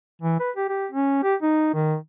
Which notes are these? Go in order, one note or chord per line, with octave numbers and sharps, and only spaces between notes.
E3
B4
G4
G4
C#4
G4
D#4
D#3